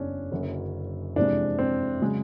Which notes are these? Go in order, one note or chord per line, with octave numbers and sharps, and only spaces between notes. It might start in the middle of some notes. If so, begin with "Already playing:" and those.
Already playing: F#1 E2 C#3 C#4 D4
F#1 F#2 D3 F#3
F2 C3 E3 G#3 D4
C4
C#3 F#3 G#3